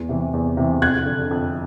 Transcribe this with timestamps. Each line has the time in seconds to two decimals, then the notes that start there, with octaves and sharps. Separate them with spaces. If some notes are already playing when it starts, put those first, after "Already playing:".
Already playing: E2
0.09 C3 E3
0.33 E2
0.57 C3 E3
0.82 F2 F#6 G#6
1.06 D3
1.31 F2